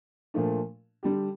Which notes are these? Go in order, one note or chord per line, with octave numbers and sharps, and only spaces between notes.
A#2 F3 A3 D4
D3 G3 D4 G4